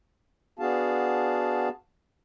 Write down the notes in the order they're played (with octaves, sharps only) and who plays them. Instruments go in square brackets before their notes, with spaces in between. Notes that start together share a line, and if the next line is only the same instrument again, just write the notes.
[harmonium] B3 D4 F#4 G#4 F5 A5